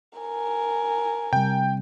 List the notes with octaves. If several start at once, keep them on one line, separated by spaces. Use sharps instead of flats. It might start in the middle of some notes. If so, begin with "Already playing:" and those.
A#4 G#5
C3 G3 G5